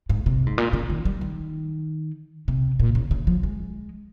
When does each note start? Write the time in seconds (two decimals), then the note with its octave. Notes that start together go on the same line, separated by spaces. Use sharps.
0.09 G#2
0.26 C3
0.47 G#2
0.58 A#2
0.73 C#3
0.90 D#3
1.05 G3
1.21 D#3
2.48 C3
2.79 A#2
2.95 C#3
3.11 C#3
3.27 F3
3.43 G#3